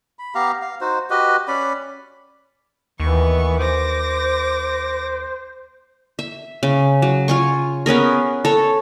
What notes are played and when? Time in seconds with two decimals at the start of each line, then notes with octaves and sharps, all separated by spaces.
0.19 B5
0.35 B3 G4 F5 A#5
0.62 F5
0.81 D#4 F#4 C5
1.10 F#4 G4 B4 D#5
1.48 C#4 D5 B5
3.00 D#2 E3 B3 C#6
3.60 C5 D6 A#6
6.19 E5
6.63 C#3
7.02 F#3
7.28 F4 G#5 C#6
7.86 B3 C#4 G#4 A#4
8.45 A4 C#5